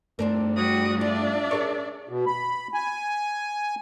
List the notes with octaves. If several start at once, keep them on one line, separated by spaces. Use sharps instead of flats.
G2 A3 C4 D4 A#4
G3 F#4 D#6
D4 F4 D5 E5
G#4 A#4 C#5
B2
B5
G#5